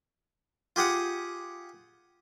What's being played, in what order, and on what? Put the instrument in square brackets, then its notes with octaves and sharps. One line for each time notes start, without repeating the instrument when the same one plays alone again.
[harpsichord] F4 G4 G#4 F#5